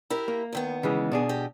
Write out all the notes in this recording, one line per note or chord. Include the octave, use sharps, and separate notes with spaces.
E4 G4 A#4
A#3
E2 D#3 B3
C#3 E3 G#3
B2 D4 G#4
G4 D#5